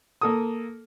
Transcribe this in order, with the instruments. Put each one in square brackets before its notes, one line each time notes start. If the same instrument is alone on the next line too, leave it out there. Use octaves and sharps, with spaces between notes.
[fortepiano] A#3 A4 D#6